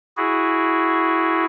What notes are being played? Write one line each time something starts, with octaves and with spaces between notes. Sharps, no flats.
E4 F#4 G#4